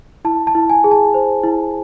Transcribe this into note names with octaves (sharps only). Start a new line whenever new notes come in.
E4 A5
A5
E4
G#5
G#4
A5
C5
E4